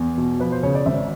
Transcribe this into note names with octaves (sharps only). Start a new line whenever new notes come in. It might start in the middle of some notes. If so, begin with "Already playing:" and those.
Already playing: E2
B2
F3 B4
C5
C#3 C#5
D5
G#1 E5